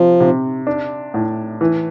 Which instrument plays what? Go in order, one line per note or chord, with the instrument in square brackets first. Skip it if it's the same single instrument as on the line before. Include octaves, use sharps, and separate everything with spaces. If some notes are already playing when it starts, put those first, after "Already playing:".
Already playing: [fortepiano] C3 [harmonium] F3
[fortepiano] C3
D4
A2
E3